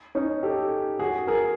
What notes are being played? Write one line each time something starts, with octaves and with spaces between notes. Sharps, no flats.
C#4 D#4
G4 A4
F#4 G#4
G#4 A#4